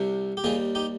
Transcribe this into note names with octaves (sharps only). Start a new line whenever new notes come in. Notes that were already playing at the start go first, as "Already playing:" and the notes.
Already playing: C2 C3 G3
G4
D#2 D#3 G3 F4 G#4
D#4 G4